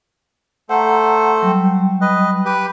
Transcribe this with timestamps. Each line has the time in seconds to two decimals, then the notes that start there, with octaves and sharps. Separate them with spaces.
0.69 A3 A4 C5 F#5 A#5
1.42 F#3 G3 G5
2.01 B4 D#5
2.45 G4 B4